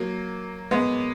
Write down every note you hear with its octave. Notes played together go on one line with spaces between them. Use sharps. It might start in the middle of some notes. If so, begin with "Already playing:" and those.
Already playing: F#3 A#3
G#3 B3